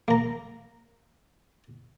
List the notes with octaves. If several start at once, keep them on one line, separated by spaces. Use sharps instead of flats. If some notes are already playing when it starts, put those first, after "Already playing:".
A#3 A#5